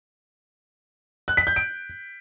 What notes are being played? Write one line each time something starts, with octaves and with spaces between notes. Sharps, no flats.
F#6
B6
G6
D7